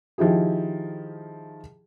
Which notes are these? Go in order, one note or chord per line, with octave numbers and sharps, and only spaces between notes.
D#3 F3 E4 G4 G#4